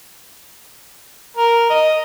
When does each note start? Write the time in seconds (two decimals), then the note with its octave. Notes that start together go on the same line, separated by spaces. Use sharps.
1.37 A#4
1.70 D#5